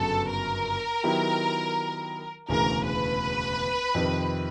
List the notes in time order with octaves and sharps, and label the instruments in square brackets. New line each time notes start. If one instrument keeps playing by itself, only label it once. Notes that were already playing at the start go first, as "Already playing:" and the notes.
Already playing: [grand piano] G1 F#2 C#3 F#3 B3 [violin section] A4
[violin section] A#4
[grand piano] D#3 F#3 B3 E4 G4
[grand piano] E1 D2 C#3 E3 [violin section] A#4
[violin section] B4
[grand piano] F2 C3 D#3